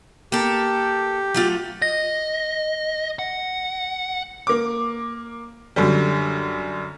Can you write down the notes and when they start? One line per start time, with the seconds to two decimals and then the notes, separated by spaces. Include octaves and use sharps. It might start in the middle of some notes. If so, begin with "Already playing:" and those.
0.32 A#3 G4 A4
1.34 F#3 A3 F4
1.82 D#5 A#6
3.19 F#5
4.47 A#3 D6
5.76 F#2 D3 G3